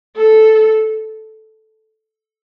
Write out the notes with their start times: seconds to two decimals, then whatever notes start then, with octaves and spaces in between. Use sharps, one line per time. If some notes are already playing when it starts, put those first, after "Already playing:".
0.16 A4